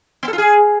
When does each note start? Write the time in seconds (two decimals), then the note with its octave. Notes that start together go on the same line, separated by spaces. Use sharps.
0.23 B3
0.28 A4
0.33 F4
0.38 G#4